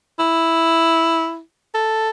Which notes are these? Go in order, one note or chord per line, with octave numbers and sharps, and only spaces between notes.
E4
A4